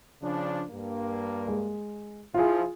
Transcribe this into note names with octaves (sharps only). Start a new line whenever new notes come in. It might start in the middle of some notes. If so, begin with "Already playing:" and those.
C#3 F3 D4
G2 A#3
G#3
F3 E4 F4 G#4